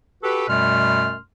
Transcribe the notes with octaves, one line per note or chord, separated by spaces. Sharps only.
F#4 G4 A4 B4
F#2 B2 G3 A3 C6 F6